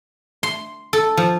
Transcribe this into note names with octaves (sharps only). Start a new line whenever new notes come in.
C6
A4
F3